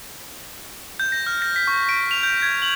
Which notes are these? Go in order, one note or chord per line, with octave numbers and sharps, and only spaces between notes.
G6
A#6
F6
A#6
B6
C#6
D7
F7
G6
G#6
F#7